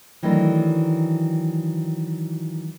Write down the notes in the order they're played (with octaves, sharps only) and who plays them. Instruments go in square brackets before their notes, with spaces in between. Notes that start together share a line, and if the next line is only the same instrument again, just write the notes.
[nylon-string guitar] D#3 E3 F#3 A3 D4